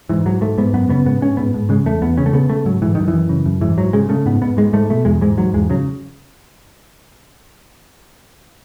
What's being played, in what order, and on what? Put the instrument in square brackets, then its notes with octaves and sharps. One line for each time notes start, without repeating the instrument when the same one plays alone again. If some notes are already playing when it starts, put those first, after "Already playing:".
[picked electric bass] G#2 E3
G#2 F#3
G#2 A3
G#2 B3
F#2 B3
C#3 B3
G#2 B3
G#2 C#4
G#2 B3
G#2
C#3 G#3
E2 A3
E2 B3
C#3 C#4
A3
C#3 B3
C#3 A3
G#2 F#3
G#2 E3
F#2 D#3
E3
F#2
C#3
F#2
G#2 E3
G#2 F#3
C#3 G#3
C#3 A3
G#2 B3
G#2 B3
G#2 G#3
G#2 A3
B2 A3
E2 G#3
G#2 G#3
G#2 F#3
E2 G#3
C#3 F#3